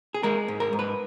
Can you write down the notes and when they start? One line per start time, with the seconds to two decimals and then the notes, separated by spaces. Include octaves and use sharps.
0.14 G#4
0.23 G#3 A#4
0.48 G#2
0.60 A#4
0.73 G#2
0.79 B4